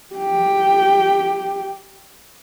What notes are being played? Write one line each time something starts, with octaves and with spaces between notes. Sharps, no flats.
G4 G5